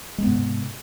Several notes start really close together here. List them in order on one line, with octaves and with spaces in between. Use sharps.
G#3 B3 G#2 C3